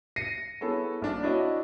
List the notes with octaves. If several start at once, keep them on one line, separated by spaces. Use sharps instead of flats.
A#6 C7 C#7 D#7
B3 E4 G#4 A4 C#5
A#1 D4
D4 E4 F#4 C#5 D#5